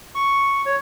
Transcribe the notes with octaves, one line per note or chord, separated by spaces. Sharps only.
C#6
C#5